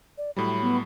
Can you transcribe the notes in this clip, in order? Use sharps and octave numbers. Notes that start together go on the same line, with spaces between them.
D5
A2 F#3 G3 B5
B3